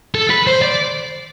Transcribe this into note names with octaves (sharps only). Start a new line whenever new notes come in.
A4
B4
C5
D5